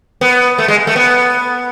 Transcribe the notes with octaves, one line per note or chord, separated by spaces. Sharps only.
B3
A3
G#3
A3
B3